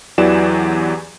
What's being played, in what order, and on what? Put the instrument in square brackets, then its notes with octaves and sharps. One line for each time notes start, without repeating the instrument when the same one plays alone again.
[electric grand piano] E2 E3 F#3 G4 D5 E7